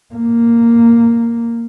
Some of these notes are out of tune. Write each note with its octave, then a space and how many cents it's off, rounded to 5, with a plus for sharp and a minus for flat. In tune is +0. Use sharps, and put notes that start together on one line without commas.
A#3 -5